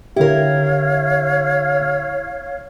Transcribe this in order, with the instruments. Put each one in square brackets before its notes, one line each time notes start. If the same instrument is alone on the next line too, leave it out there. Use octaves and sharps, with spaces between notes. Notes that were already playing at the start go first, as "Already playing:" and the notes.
[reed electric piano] D3 G4 [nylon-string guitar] E4 A#4 [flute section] C#5 F5